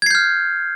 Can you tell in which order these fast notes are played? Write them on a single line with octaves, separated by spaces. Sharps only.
G#6 C7 G6 F6